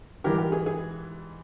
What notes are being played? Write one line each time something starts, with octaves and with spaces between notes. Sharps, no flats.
G#2 E3 G3 G4 A#4
G4 A#4
G#4
G#4